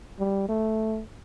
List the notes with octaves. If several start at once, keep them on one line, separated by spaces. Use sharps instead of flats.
G3
A3